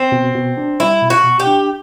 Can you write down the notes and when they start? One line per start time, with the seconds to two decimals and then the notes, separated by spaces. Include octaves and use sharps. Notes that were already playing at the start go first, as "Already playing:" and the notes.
Already playing: C4
0.12 B2
0.35 B2
0.57 D4
0.80 G3 E4
1.02 B2
1.10 F#4
1.24 B2
1.40 G4
1.47 D4